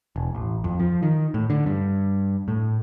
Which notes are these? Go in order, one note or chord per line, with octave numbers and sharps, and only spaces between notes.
E1
A1
F2
F3
D#3
A2
D3
G2
A2